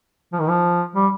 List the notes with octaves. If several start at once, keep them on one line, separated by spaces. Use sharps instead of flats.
F3
D#3
F3
G3